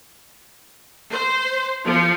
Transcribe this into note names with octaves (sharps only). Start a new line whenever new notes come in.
C5
F3